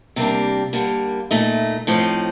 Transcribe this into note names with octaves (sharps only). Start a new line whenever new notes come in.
C3 G3 A#3 D4
D3 G3 A#3
A#2 A3 D#4
A2 F3 C4 D#4